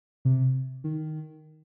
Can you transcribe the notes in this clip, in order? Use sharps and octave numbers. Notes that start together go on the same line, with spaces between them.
C3
D#3